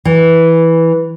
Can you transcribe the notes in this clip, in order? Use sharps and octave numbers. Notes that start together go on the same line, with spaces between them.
E3